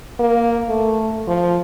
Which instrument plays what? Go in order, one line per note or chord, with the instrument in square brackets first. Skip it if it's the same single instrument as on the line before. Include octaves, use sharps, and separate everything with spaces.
[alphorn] A#3
A3
F3